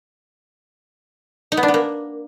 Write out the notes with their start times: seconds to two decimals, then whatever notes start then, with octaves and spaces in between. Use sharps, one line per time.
1.52 D#4
1.57 B3
1.63 D4
1.68 B3
1.74 A#3